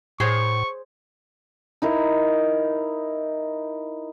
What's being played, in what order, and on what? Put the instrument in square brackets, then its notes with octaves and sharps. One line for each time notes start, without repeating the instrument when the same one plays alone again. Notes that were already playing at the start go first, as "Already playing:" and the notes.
[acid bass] A2 [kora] G#4 C5 C#5 [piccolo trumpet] C#6
[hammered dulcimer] D#4 E4 A#4